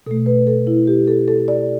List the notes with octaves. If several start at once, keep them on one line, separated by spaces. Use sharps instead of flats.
B2 A3 A4
B4
A4
E4
G4
A4
A4
D5